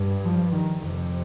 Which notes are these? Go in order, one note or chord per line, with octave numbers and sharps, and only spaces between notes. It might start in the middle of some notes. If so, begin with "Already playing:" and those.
Already playing: G2
F3
D#3
F2 C3 D#3